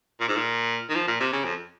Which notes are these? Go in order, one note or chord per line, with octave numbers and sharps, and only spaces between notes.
A#2
G#2
A#2
D#3
F3
A#2
C3
C#3
F2